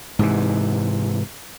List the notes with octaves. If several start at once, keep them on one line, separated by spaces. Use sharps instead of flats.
G#2 C3 E3